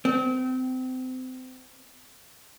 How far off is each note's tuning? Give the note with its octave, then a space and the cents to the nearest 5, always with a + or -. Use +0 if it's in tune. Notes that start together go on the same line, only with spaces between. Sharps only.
C4 -30